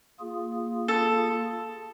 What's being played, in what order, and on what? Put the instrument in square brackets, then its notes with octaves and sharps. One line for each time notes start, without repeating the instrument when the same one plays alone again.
[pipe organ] A#3 F4 G#4
[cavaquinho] A4